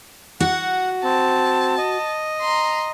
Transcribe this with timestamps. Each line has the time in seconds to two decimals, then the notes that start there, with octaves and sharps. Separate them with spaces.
0.40 F#4 F#5
1.04 C4 A5
1.78 D#5
2.42 A#5 C6